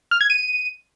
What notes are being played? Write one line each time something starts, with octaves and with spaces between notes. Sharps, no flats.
F6
G#6
D#7